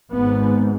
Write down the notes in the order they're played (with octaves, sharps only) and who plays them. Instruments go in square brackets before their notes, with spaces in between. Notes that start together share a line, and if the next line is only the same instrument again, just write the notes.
[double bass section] G#1 G#2 B3